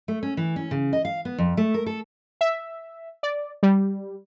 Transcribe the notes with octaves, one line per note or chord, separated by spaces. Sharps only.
A3
C#4
E3
C#4
C#3
D#5
F5
B3
F2
A3
A#4
A4
E5
D5
G3